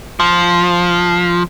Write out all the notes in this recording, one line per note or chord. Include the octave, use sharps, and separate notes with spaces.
F3